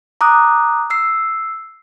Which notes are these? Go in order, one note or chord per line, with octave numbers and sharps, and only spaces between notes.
A#5 D6 D#6 F#6
E6 C7